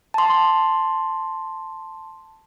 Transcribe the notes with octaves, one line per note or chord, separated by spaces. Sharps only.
A5 C6